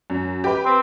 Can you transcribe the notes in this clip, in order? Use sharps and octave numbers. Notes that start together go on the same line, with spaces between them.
F#2
G4 B4
C4